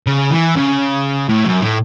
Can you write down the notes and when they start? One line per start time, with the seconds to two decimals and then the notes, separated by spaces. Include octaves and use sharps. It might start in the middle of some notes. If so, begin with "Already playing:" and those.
0.07 C#3
0.31 E3
0.56 C#3
1.29 A2
1.45 F#2
1.61 A2